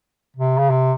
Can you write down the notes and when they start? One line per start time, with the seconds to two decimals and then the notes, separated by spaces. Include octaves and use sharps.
0.37 C3
0.58 C#3
0.70 C3